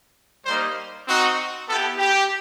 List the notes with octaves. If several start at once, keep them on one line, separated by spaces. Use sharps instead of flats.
G3 A#3 D#4 C5
C4 D#4 F#4
B3 E4 G4 A4
G4